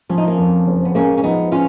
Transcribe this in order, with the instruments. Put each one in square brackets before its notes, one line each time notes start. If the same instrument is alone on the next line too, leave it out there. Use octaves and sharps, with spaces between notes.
[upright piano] F3 [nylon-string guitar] C#4
[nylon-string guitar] D#4
A#3 C#4
[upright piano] F2
F#1
[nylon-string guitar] B3
[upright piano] G#3 [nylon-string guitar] A#3 C#4
[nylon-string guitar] C#4
[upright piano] F3 [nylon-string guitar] B3 D#4
[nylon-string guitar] C#4 F4